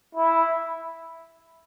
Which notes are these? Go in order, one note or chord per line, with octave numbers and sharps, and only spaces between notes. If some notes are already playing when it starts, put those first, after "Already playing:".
E4